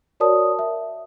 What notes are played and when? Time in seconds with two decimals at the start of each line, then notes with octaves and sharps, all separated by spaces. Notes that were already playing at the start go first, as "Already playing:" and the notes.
0.20 F#4 A#4 C#5 D5 A5 D#6
0.59 E5